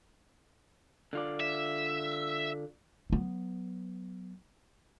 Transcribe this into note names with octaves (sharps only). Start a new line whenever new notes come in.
D3 F4 D5
E5
F#3 B3